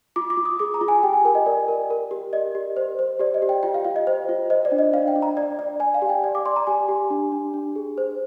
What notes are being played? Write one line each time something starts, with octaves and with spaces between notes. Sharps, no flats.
F4 D6
D6
F4
D#6
G#4 D6
A#5
F4
G#5
G4 G5
G#5
A#4 G5
D#5
A#4 D5
A#4
A#4
G4
D5 D#5
G4
C5
C5
G4 D5
D#5
G4
G5
F4 G5
F5
F4 F5
D#5
C5 D#5
F4
C5 D#5
D5
D4
D#5
D4 F5
G5
D4
A#5
D5
D5
D5 G#5
F5
G4
G5
D5
D6
D5 C6
A#5
G4 G#5
G4
D4
D4
D4
G#4
C5